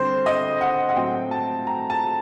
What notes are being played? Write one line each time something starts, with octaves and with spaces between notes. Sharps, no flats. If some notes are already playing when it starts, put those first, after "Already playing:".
Already playing: D3 G3 C4 C5
D#5
F#5
F#5
A2 F#3 C4 G5
A5
A#5
A5